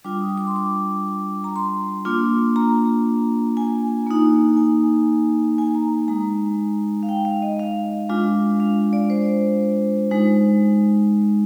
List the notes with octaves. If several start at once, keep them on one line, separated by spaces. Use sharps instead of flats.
G3 D4 F4 D6
D#6
D6
C6
D6
A#5
C6
A#3 D4 F4
A#5
G#5
A#3 D#4
G#5
G#5
A#5
G#3 D#4 A#5
F5
G5
F5
D#5
F5
G#3 D4 F4
F5
D5
C5
G#3 D#4